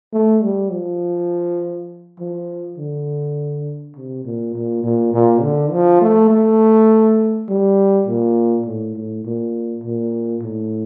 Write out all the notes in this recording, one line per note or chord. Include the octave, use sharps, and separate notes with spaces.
A3
G3
F3
F3
D3
C3
A#2
A#2
A#2
A#2
D3
F3
A3
A3
G3
A#2
A2
A2
A#2
A#2
A2